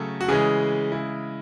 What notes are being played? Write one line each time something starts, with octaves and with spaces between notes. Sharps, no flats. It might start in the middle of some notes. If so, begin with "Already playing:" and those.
Already playing: C#3 F#3 A3 A4
F#4
C#3 E3 G#3 G#4
C#3 G#3 E4